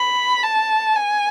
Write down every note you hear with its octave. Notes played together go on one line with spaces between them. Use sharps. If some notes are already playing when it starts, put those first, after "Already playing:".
Already playing: B5
A5
G#5